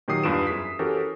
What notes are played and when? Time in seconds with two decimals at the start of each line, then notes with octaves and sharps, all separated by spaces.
0.08 A#2 D#3 F#3 G4 D#6 C7
0.23 E2 G2 F4 B4 D7 E7
0.47 F#2 G#4 B6
0.79 E3 C#4 F#4 G4 A4 A#4